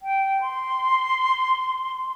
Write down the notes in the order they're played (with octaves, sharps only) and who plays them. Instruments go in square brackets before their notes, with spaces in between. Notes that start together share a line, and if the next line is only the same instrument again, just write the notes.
[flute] G5
C6